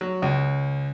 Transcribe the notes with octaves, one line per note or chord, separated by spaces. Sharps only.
F#3
C#2